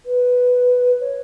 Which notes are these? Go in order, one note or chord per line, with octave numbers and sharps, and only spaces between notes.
B4
C#5